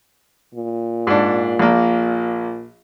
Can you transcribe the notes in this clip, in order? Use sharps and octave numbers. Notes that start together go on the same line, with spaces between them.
A#2
G#2 D4
A#1 A#3